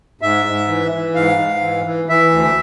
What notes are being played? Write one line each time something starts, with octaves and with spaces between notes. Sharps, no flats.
G#2 E5
G#2
E3
E3
G#2 F5
G#2
E3
E3
E3 E5
D2